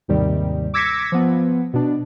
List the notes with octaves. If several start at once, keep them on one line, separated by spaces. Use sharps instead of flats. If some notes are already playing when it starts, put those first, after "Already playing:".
D#2 G#2 C3 D#3 G3
D6 E6 G#6 A#6 B6 C#7
F3 B3
B2 D4